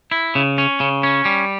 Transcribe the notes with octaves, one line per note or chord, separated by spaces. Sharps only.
E4
C#3
C#4
C#3
C#4
G3